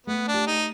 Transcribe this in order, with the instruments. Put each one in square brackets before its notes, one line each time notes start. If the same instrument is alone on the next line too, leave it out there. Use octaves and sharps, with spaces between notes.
[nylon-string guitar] A3 [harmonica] B3
[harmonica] D4
[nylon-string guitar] G4
[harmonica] D#4